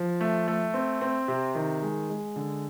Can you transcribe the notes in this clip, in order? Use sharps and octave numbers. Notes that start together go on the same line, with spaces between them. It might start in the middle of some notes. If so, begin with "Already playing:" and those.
Already playing: F3
A3
A3
C4
C4
C3
D#3
G#3
G#3
D3